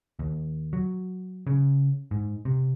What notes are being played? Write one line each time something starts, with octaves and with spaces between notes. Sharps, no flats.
D#2
F#3
C#3
G#2
C3